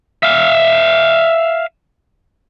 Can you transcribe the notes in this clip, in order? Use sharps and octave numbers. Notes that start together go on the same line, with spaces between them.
E5 F5